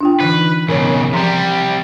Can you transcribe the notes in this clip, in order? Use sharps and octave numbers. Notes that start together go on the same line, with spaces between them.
D4 F4 G5
D3 E3 D#4 B4
B1 C#3 A#4 C#5
C3 F3 G3 A#5 C6